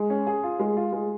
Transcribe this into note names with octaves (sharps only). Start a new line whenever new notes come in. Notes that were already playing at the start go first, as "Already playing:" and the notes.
Already playing: G#3
C#4
G#4
F4
G#3
F4
G#3